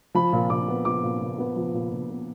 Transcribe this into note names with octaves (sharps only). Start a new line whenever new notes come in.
F3 B5
A#2
A#2 D6
B3
F3 D6
A#2
A#2
B3
F3
A#2
A#2
B3